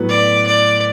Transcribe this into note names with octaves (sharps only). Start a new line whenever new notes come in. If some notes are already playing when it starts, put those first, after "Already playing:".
Already playing: A2 F#3 B3 F#4 B4
D5
D5